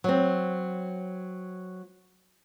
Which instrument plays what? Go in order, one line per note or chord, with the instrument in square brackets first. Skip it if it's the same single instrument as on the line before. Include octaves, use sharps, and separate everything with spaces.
[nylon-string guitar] F#3 C4